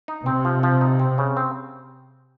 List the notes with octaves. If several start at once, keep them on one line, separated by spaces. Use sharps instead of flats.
D#4
C3 C4
F3
F3
D#4
C4
C#3
C4